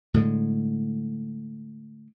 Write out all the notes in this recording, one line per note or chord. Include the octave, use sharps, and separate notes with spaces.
A2 D3 G#3